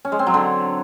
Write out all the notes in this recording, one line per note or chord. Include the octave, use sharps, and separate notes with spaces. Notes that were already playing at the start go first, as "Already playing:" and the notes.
C#4
G#3
C4
F#3
D3